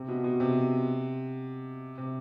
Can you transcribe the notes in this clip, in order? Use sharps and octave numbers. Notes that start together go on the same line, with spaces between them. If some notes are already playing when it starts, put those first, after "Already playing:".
Already playing: C3
B2
B2
C3
C3